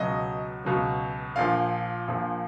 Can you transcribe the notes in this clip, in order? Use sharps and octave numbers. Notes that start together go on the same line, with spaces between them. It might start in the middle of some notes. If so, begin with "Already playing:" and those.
Already playing: C#2 B2 F#3 D#5
C#2 B2 F#3
A#1 A#2 F3 F5
A#1 A#2 F3